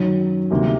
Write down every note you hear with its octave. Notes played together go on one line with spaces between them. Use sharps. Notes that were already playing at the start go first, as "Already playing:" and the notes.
Already playing: F#2 D#3 F#3
D2 C3 D#3 G3 A#3